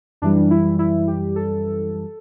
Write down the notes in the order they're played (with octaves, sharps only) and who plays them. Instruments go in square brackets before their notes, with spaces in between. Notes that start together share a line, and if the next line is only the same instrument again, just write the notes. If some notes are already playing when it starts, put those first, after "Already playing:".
[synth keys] F#2 E3 G3 D4
E4
E4
G4
A4